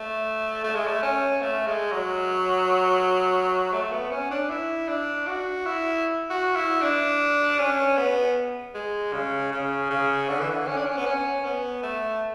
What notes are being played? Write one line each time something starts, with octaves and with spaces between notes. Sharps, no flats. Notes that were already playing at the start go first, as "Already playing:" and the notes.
Already playing: A3
A3
G#3
A3
C#4
A3
G#3
F#3
A3
B3
C#4
D4
E4
D4
F#4
E4
F#4
E4
D4
C#4
B3
G#3
C#3
C#3
C#3
D3
E3
D3
C#4
D4
C#4
B3
C#4
B3
A3